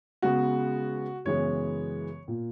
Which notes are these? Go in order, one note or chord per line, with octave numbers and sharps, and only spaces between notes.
C#3 G#3 B3 F#4
F#2 C#3 E3 G#3 B3 C#5
A#2 A#3